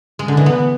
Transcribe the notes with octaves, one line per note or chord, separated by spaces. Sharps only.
G#3
D3
E3
B3